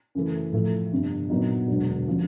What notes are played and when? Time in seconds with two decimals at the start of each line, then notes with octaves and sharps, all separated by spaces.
0.15 F#2 C#3 E3 A3
0.53 A2 F3 A3
0.92 G1 F2 C3
1.30 A#2 F#3 B3 D#4
1.68 E1 D2 D3 F#3
2.08 D3 F3 A#3 C#4